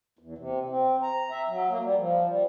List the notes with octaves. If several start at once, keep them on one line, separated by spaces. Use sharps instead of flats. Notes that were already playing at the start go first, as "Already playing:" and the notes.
E2
C3
C4
A#5
E5
F#3
A#3
G3
F3
G3